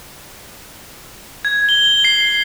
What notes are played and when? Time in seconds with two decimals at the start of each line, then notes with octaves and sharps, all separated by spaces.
1.45 G#6
1.69 G7
2.04 C7